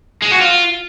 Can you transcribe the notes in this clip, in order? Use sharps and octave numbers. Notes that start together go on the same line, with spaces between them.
G#3
F#4
F4